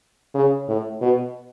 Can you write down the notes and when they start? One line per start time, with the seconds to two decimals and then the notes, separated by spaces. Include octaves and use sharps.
0.34 C#3
0.68 A2
1.01 B2